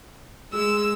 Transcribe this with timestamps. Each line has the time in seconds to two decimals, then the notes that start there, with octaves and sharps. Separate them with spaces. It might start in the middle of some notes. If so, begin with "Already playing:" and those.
0.53 G#3 E6